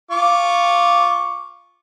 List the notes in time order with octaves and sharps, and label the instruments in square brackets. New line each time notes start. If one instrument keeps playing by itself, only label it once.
[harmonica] F4 C#6 D6